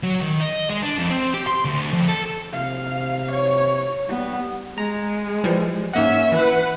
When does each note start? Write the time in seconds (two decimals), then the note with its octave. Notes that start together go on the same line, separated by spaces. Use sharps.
0.03 F#3
0.21 D#3
0.40 D#5
0.70 G#3
0.83 D4
0.99 F2
1.10 C4
1.34 G4
1.47 C6
1.65 D2
1.93 F2
2.09 A4
2.53 C3 F5
3.32 C#5
4.08 G3 B3
4.78 G#3 A#5
5.44 E3 F3 G3
5.94 G#2 A#3 C#4 E5 F#5
6.32 E3 B4 F#5